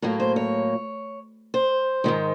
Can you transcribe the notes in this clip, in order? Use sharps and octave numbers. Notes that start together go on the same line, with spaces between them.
A2 F#3 A#3 A#4
C5
C#5
C5
G#2 D#3 G#3